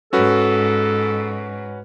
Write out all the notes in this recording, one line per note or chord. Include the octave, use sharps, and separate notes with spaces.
G#2 C#4 F#4 A4 B4